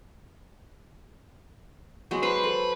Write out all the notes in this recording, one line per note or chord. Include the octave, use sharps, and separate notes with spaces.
F#3 G#3 B3
B4 C5
A4